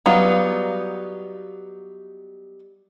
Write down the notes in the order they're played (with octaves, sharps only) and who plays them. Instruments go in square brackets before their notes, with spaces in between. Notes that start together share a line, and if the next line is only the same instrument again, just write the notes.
[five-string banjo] F#3 G3 B3 D#4 F4